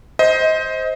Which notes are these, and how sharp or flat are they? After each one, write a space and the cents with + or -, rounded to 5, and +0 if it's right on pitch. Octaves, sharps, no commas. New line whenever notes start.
C5 +0 D#5 +25